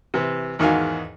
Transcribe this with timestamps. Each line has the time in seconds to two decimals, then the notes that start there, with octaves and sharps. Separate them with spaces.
0.14 C3 E3
0.59 E2 G#2 D#3 F#4 F5 G#5